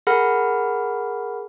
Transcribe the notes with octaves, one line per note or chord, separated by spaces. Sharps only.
G#4 A#4 F#5 B5 F6